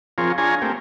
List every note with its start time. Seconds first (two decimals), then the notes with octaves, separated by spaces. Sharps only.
0.18 F3 C4 F4 G#4 A#4 C#5
0.38 D4 F4 G#4 C#5 G#5 A#5
0.62 A3 A#3 C4 G4